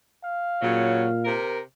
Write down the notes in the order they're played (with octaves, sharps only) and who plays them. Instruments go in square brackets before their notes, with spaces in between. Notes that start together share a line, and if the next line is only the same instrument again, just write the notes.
[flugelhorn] F5
[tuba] A#2 [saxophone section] C#3 F#3
[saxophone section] C3 A#4